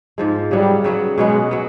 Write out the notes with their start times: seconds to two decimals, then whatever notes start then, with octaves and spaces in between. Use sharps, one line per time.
0.18 G#2 F3 G#3
0.51 C#3 F#3 G3 B3
0.84 C#3 F#3 B3
1.17 B2 F#3 G#3 B3
1.51 F#3 B3